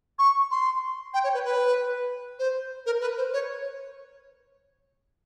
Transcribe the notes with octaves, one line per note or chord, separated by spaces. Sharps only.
C#6
C6
G5
C#5
B4
B4
C5
A#4
B4
C5
C#5